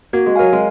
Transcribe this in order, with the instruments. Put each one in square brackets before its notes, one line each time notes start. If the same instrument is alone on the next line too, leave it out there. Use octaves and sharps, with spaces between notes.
[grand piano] A#3 [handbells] F#4
[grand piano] G#3
[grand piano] F#3 [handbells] A#4 F5 G#5
[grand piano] G#3